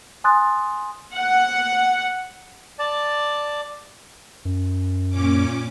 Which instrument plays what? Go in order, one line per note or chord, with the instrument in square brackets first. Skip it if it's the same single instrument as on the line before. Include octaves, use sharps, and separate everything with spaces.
[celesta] G#5 C6 D#6 F#6 A6
[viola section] F#5
[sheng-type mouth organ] D5 A5
[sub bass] F#2
[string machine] A#2 C#4 D6